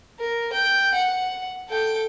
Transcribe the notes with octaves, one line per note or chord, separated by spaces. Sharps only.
A#4
G5
F#5
A4 G5